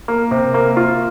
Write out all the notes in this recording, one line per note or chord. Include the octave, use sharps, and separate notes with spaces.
A#3
C3
A#3
F4